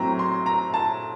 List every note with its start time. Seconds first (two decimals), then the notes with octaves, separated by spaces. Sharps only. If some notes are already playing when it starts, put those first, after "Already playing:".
Already playing: A2 F#3 C4 A#5
0.19 C6
0.46 A#5
0.74 A5